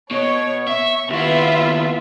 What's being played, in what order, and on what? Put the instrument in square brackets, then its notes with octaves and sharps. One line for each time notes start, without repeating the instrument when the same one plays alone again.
[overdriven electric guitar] B2 [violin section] C#5
[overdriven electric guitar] E5 [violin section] C#6
[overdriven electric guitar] D#2 E4 [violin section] B3 F4 E5